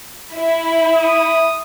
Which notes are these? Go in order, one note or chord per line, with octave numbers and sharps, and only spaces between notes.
E4
D#6